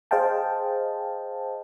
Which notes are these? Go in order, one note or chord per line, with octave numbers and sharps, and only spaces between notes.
G#4 C5 D#5 F5 G5 A5